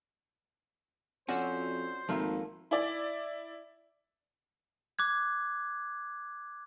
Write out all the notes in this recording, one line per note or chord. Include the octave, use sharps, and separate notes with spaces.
F2 C#4 F#4 C5 D5 E6
G#1 F3 A3 A#3
E4 D5
D6 F#6 G#6